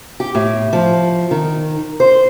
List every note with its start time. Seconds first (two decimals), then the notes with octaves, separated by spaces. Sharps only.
0.20 G4
0.35 A2
0.73 F3
1.31 D#3
2.00 C5